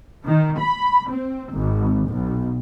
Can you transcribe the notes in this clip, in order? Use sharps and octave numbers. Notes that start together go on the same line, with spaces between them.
D#3
B5
C4
G#1
B1